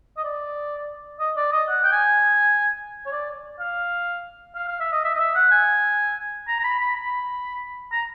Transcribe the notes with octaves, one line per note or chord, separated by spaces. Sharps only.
D#5
D5
D#5
D5
D#5
F#5
G5
G#5
C#5
D5
F5
F5
F5
E5
D#5
E5
D#5
E5
F#5
G#5
A#5
A#5
B5
B5
B5
A#5